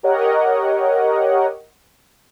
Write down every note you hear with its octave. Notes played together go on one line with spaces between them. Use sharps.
G4 A#4 C#5 D#5 F#5